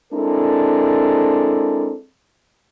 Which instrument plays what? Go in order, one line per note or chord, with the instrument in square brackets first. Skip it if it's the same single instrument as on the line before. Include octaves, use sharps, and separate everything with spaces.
[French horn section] G#3 C4 D4 E4 A4 A#4